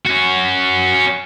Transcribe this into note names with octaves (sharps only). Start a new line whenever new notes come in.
C#4 F#4